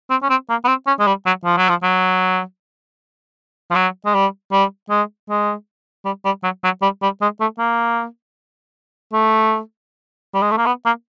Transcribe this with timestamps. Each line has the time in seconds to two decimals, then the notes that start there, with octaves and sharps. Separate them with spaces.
0.10 C4
0.23 C#4
0.30 C4
0.50 A#3
0.64 B3
0.68 C4
0.87 C#4
0.99 G#3
1.07 G3
1.26 F#3
1.45 F3
1.57 F#3
1.69 F3
1.83 F#3
3.71 F3
3.75 F#3
4.06 G#3
4.14 G3
4.52 G3
4.90 G#3
5.29 G#3
6.05 G3
6.25 G3
6.44 F#3
6.64 F#3
6.82 G3
7.02 G3
7.21 G#3
7.41 A3
7.59 A#3
9.13 A3
10.34 G3
10.42 G#3
10.51 A3
10.58 A#3
10.66 B3
10.85 A#3